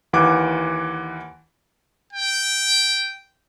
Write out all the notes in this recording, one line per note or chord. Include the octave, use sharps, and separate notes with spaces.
D#2 E3 F#5 D6
G5